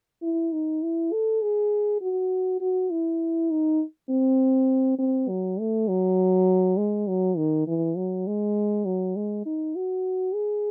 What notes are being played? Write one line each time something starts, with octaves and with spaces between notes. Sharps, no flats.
E4
D#4
E4
A4
G#4
F#4
F#4
E4
D#4
C4
C4
F#3
A3
F#3
G#3
F#3
D#3
E3
F#3
G#3
F#3
G#3
D#4
F#4
G#4